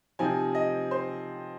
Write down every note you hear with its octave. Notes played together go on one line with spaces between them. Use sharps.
C3 F3 C4 D#4 G#5
D#5
C5